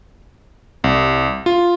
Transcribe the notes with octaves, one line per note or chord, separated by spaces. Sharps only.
C2
F4